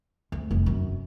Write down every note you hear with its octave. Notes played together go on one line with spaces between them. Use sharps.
D2
F1
F#2